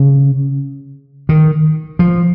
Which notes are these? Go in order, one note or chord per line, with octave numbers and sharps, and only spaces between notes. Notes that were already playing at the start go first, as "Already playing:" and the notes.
Already playing: C#3
D#3
F3